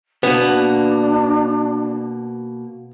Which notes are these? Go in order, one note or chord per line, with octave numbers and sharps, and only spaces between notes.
B2 A#3 B3 D4